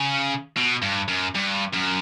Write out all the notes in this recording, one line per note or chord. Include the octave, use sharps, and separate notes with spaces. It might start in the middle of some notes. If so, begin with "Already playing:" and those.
Already playing: C#3
B2
G2
F#2
G2
F#2